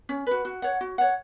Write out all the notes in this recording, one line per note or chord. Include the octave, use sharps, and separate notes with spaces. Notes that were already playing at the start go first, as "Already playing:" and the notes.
C#4
F#4 B4
F#4
C#5 F#5
F#4
C#5 F#5